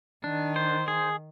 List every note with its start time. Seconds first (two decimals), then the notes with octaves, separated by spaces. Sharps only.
0.24 D#3 D4
0.56 C5
0.88 G#4